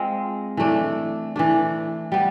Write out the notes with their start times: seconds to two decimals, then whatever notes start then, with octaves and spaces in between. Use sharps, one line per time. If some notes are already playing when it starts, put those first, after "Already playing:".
Already playing: G#3 C4 F4
0.57 E3 A3 D4
1.36 E3 A3 D4
2.12 G3 B3